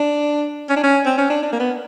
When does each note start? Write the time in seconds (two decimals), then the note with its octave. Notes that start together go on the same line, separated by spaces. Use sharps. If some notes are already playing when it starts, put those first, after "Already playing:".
Already playing: D4
0.69 C#4
0.77 D4
0.83 C#4
1.06 C4
1.18 C#4
1.30 D4
1.43 D4
1.52 A#3
1.60 B3